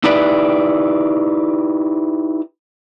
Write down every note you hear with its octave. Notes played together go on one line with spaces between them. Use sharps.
D#4 E4 G4 B4 D5